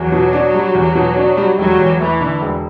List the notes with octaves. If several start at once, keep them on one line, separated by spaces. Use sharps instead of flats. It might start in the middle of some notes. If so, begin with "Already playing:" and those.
Already playing: E2 F#3
B2
D4
G3
E2
B2
D4
G3
E1 F#3
E2
E3 A3
D3
E1